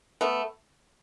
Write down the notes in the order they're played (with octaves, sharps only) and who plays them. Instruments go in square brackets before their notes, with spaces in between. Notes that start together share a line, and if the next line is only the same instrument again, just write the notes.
[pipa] A3 B3